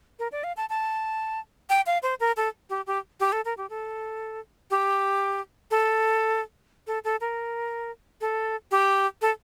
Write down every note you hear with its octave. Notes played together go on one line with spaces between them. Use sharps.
A#4
D5
F5
A5
A5
G5
F5
C5
A#4
A4
G4
G4
G4
A4
A#4
G4
A4
G4
A4
A4
A4
A#4
A4
G4
A4